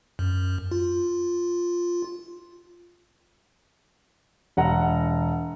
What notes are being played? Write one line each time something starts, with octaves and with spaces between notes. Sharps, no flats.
F#2
F4
E1 F#5 A#5